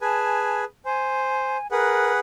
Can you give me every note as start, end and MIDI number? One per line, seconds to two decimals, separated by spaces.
0.01 0.64 68
0.01 0.64 71
0.01 0.64 80
0.01 0.65 81
0.85 1.57 72
0.85 1.67 80
1.71 2.20 68
1.71 2.12 70
1.71 2.20 71
1.71 2.20 78